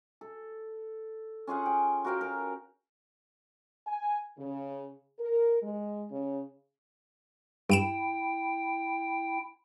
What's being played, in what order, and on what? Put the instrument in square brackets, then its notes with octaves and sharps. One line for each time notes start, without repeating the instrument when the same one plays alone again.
[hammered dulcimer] A4
C#4 F4 G#4 F#5
G5
F#4 A#4 F5 G5
A#4
[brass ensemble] G#5
C#3
A#4
G#3
C#3
[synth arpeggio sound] G2 D7 E7 [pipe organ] E4 G5